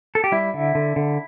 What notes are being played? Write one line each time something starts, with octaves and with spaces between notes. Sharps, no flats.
A4
G4
G3 E4
D3
D3
D3